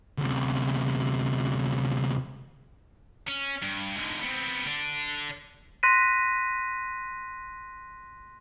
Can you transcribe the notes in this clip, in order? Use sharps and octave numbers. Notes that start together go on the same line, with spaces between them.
D2 C3
C#4
G2
G#2 D3
B3 C4
D3 D4
C6 F#6 A#6 B6 D#7